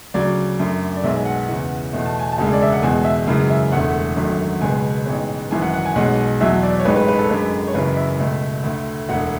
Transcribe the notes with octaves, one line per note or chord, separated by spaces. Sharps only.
D2 C#3 F#3 D5
F#2 D3 A3
D5
B1 B2 G#3 B3 E5
G#5
F#5
E2 C#3 E3
E2 B2 A3
A5
G#5
A5
E1 D2 C#3 G#3
D5
E5
F#5
E2 B2 G#3 G#5
E5
F#2 C#3 E3 G#3
E5
E1 E2 D3 A3 F#5
G#1 F#2 D3 F#3 A3
C#2 B2 G#3 B3 G#5
A1 G#2 G#3 B3
G#1 F#2 E3 G#5
F#5
F#5
G#5
B1 B2 G#3 F#5
E2 B2 F#3 E5
D5
C#5
A1 G#2 G#3 B4
B4
B4
A4
F#2 D3 G#3 B4
C#5
F#1 F#2 C#3 E3 B4
E5
C#2 B2 A3
D2 D3 A3
E1 D2 D3 F#5